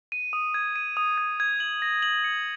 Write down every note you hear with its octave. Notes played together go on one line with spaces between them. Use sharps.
D#7
D#6
G#6
D#7
D#6
G#6
G#6
F#7
A#6
F#7
C#7